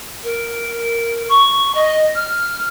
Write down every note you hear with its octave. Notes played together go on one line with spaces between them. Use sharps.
A#4
C#6
D#5
F6